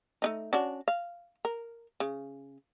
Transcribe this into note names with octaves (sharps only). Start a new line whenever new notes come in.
A3 D4 D#4
C#4 D4 F#4
F5
A#4
C#3